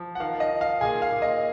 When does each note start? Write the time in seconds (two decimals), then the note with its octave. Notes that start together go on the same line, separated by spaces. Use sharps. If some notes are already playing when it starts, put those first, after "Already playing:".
Already playing: F3
0.15 F#5
0.20 D#3 F5
0.40 D#5
0.51 D#3
0.61 F5
0.81 A#2 G#4 G#5
1.02 F5
1.11 A#2
1.22 D#5